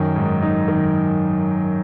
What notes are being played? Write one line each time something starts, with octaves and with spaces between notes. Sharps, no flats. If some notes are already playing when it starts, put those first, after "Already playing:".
Already playing: F#2 D#3
G#2
D#4
D#3